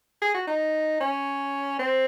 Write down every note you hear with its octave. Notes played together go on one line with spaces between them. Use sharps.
G#4
F#4
D#4
C#4
C4